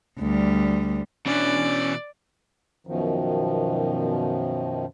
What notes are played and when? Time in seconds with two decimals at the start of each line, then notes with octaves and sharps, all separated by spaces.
0.19 D2 G3
1.26 B2 E3 C#4 D4 D5
2.87 F#2 B2 D#3 F3